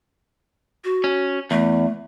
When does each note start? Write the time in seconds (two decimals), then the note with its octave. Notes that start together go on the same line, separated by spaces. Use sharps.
0.85 F#4
1.04 C#4
1.51 E2 A3